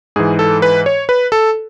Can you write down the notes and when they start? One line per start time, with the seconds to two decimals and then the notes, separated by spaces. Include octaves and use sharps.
0.16 G#2 E3 G#4
0.39 A4
0.62 B4
0.86 C#5
1.09 B4
1.32 A4